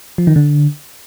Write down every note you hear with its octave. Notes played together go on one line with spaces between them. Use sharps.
F3
D#3
D3